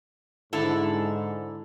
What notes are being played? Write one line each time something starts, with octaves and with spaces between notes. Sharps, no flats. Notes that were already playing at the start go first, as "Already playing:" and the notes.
G#2 D3 E4 A4